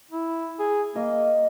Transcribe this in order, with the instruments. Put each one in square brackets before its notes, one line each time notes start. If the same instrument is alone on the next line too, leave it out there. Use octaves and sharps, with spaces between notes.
[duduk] E4
G#4
[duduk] A#3 [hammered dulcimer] D#5